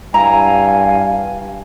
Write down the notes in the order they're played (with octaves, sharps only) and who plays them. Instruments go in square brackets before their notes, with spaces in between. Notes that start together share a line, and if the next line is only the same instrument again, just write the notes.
[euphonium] G2 [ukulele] E4 A#5 [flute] F5 [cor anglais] G#5